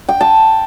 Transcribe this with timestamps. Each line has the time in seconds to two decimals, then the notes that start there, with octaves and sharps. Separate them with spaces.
0.09 G5
0.21 A5